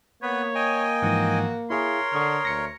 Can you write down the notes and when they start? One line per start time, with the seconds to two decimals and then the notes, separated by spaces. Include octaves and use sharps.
0.22 A#3 B3 B4 C#5
0.55 D#5 G5 G#5
1.02 G#2 E3 F3 F#4
1.70 E4 G#4 A#4 C#5 F5 C6
2.13 D3 C#6 D#6 F6
2.45 D2 A#6 C#7